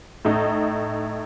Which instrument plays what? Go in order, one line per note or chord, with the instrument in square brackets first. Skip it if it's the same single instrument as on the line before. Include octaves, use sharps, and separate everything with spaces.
[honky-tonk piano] A2 D#4